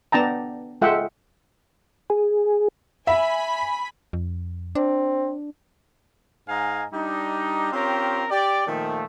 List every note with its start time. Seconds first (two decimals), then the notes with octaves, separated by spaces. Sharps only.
0.12 B3 D4 G5 A5 A#5
0.82 G#3 F4 A4 E5 F#5 G5
2.10 G#4
3.07 E5 G#5 B5
4.13 F2
4.75 C4 D4
6.49 G#2 D#5 F5 G#5 A#5
6.93 G3 D4 D#4
7.73 C4 C#4 F4 G4 A#4
8.31 G4 D5
8.66 A#2 D#3 F3 A3